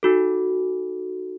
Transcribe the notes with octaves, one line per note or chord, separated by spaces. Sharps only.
D#4 F#4 A4